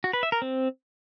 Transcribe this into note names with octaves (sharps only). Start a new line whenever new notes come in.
F#4
B4
E5
A#4
C4